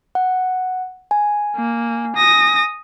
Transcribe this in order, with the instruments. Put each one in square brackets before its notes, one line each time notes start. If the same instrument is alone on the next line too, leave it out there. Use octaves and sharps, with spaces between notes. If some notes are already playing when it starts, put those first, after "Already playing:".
[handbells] F#5
G#5
[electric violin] A#3
D#6 A#6